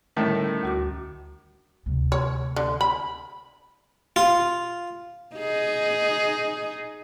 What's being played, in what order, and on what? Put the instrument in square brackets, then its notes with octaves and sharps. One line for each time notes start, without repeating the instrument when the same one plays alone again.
[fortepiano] A2 D#3 A3 [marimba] D3 G3 C#4
[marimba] D2 F#4 D6
[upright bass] D2 C3
[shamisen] C#5
D3
B5
[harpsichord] F4
[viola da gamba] D#4 G#4